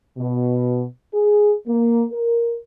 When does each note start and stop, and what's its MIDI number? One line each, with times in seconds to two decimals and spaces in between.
0.18 0.83 47
1.14 1.53 68
1.67 2.02 58
2.11 2.56 70